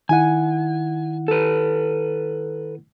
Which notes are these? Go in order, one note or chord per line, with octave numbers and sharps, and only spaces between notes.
D#3 E4 F#5 G#5
A4 B4